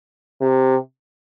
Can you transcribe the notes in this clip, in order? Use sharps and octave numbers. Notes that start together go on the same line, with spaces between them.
C3